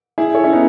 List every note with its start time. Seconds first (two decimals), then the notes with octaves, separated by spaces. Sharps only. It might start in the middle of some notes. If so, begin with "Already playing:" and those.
0.18 E4 G#4
0.35 A4 C#5
0.43 C#4 E4
0.52 B3 D#4